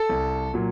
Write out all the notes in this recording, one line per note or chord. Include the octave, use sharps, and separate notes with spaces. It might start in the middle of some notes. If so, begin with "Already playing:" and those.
Already playing: A4
C2
A#2 F#3